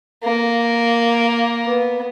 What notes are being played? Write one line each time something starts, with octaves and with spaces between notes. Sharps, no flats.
A#3
B3